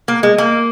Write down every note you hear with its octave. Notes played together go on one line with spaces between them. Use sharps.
A#3
G#3
A#3